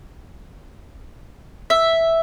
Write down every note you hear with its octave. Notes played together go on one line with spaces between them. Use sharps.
E5